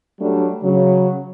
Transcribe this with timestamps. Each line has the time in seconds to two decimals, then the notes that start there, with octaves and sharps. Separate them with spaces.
0.20 F#3 G3 A3 D4
0.63 C#3 F#3